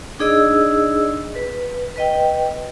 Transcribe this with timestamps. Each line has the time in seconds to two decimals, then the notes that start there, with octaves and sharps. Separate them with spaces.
0.19 D4 D#4 G#4 D5 D#5 E6
1.35 B4
1.96 B4 D#5 G5